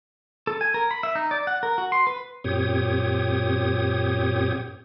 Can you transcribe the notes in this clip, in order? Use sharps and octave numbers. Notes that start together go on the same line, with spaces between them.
A4
G#5
A#4
B5
E5
D#4
D5
F#5
A#4
F#4
C6
B4
F#2 A#2 C4 G4 C#5 D#6